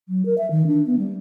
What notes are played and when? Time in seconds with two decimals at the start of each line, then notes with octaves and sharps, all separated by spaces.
0.09 F#3
0.26 A#4
0.38 E5
0.51 D#3
0.67 D4
0.87 B3
0.99 G3